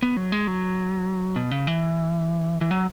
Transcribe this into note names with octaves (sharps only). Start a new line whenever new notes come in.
B3
F#3
G#3
F#3
B2
C#3
E3
E3
F#3